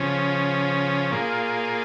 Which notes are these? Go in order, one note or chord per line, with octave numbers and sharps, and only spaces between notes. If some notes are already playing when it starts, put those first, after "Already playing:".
Already playing: C#3 F3 C#4
A#2 A#3 F4 G#4